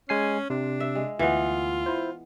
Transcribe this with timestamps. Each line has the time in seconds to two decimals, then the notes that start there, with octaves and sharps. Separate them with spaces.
0.09 G#3 C#4 G#5 C7
0.50 C3 D4
0.80 E5
0.95 G#3
1.19 D2 E3 B3 F4 E5
1.86 E4 C5